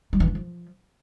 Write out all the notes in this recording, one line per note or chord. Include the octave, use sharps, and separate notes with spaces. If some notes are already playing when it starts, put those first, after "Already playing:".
G3
E3
D4
F3